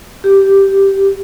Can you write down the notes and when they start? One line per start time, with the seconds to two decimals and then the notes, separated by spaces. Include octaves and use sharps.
0.24 G4